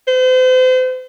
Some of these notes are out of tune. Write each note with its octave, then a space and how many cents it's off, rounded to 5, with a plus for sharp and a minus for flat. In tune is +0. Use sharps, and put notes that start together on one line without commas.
C5 -40